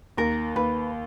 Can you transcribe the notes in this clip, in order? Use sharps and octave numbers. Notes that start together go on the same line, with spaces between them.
D#2 A#4
D#2 B4